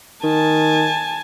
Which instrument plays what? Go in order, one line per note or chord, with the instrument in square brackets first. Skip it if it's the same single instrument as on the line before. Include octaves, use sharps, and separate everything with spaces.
[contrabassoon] D#3 [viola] G#5 A5